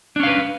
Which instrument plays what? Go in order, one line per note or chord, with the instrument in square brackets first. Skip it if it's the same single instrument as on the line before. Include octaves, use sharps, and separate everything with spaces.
[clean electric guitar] D4
C#4
F5
B4